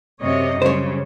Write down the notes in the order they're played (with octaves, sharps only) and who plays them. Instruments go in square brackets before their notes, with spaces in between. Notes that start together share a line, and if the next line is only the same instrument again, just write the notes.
[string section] F#2 C3 [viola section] C#5 D#5
[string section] C#3 [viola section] G3 [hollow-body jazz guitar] C5 C#5